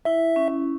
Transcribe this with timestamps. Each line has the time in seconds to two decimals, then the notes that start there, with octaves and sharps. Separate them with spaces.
0.05 E4 E5
0.36 C#4